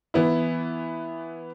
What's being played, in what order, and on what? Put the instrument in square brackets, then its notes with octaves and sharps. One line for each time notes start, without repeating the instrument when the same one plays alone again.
[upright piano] E3 B3 E4